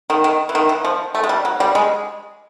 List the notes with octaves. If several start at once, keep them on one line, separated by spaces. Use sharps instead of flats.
D#3
D#3
E3
D#3
E3
F3
A3
G#3
G3
F#3
G3
G#3